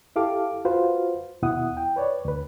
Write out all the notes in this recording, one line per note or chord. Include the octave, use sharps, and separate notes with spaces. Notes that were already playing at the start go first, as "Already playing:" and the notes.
E4 G4 A4 F5 D6
F4 F#4 B4 C5 F5
D#2 B2 E4 F#5 D#6
G5
B4 C#5 D5
D2 B4